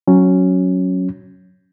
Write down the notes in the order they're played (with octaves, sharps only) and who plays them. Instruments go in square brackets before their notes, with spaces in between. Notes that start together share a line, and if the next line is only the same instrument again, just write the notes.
[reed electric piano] F#3 C#4